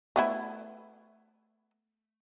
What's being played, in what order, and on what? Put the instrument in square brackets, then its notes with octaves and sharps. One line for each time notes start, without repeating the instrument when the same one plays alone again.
[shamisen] A3 B3 E4